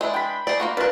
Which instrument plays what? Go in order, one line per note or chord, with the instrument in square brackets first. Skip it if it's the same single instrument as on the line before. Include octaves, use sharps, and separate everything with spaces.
[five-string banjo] G#3 D4 E4
[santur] G5 B5
[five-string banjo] G#4 D5
A#3 F4 F#4
[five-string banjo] D4 D5 [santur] F4 A#4 B4